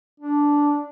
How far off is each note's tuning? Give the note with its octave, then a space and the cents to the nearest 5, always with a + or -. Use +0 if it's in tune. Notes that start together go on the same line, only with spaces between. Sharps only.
D4 -10